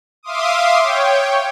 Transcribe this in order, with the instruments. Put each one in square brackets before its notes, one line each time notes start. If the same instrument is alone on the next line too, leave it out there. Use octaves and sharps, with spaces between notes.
[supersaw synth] E5 F5 C6 D6 D#6
C#5 G5